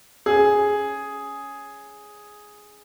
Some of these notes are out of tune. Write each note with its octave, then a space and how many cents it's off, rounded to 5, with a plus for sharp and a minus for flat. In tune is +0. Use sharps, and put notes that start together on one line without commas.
C#4 +0 G#4 +0